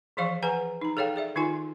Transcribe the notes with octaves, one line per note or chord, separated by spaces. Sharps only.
E3 F3 G#4 D5 F5 C#6
G#4 B4 F#5 G#5 A#5
D#4 A#5
G#4 A4 C#5 F5 G5
G#4 D5 E5
D#3 D#4 F4 G#5 C6